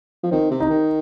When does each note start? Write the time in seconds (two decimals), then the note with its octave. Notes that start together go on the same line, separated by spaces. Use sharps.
0.23 F3
0.31 D#3 C4
0.51 C3
0.60 D#4
0.70 D#3